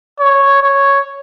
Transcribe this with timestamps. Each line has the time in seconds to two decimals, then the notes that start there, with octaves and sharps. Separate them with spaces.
0.20 C#5
0.62 C#5